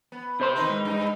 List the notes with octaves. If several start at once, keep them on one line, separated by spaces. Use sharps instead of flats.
B3
C3 C5 C6
D#3 D#4 B4
G#2
G2 D#4